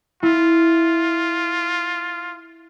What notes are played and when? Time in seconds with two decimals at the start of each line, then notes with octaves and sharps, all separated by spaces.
0.23 E4 F4